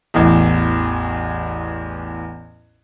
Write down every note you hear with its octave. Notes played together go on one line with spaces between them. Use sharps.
A1 E2